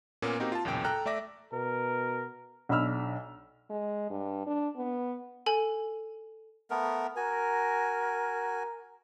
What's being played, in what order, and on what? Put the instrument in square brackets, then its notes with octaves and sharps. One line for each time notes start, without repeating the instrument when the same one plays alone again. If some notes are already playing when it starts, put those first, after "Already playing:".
[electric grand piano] A#2 A#3 B3 C#4
A#3 C4 D#4 F#4 G4 A#4
F4 A5
B1 E2 A#2 C#3 G5 D7
A4 G5 A#5 F6 F#6
A3 D5 E5 D6 A#6
[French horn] B2 [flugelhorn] A#4
[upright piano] B1 D4 B5 E6 F6
[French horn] G#3
G2
D4
B3
[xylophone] A4 G#5 F#7
[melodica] A3 B3 A#4
[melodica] F#4 G#5 [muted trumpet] A#4